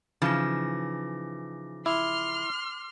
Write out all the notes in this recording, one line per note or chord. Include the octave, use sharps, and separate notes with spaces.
C#3 E3 F3 D#4 D6 A#6
E4 C6 D6 F6